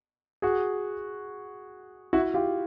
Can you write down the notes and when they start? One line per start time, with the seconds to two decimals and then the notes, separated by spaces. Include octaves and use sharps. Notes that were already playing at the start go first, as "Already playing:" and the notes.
0.42 F#4 G#4
2.13 E4 F#4
2.34 F4 G4